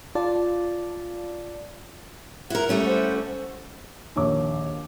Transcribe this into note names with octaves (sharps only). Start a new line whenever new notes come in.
F4 D5 A5
E4 A#4 F#5
G3 A3 C#4
C5 F#5
A#1 D#2 C#5 D6